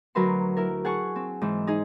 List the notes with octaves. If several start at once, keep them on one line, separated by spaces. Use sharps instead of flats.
D2 F#3 A#4 B4 E5 C6
E4 A#4
G#4 F#5 G#5 A5 C#6
C4
G#2 E3
D#4 G#4